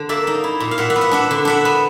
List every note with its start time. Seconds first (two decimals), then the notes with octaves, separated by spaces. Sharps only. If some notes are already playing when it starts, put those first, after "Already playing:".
Already playing: D3
0.09 A#3 D5 E5
0.27 D#4
0.44 E4
0.60 A#2
0.71 F5
0.78 A#2 E5 F#5
0.90 E5 F#5
0.96 B3
1.01 E5 F#5
1.11 D4 E5 F#5
1.31 D3
1.45 D4 E5 F#5
1.65 B3